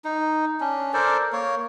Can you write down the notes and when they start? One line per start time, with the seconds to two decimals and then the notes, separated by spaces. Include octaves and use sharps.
0.05 D#4
0.61 C#4 D4
0.94 A4 A#4 C5 D5
1.33 A#3 C#5